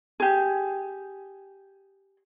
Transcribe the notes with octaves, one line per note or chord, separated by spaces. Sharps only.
G4 G#4